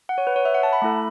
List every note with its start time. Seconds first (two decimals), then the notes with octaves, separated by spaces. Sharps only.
0.09 F#5
0.18 C#5
0.27 B4
0.36 C#5
0.45 E5
0.54 F#5
0.63 A5
0.73 B5
0.82 A3 E4 A4